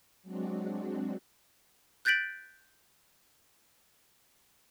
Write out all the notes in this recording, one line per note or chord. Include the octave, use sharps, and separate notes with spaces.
F#3 G#3 C4 D4 F#4
F#6 G6 A6 B6 D7 F#7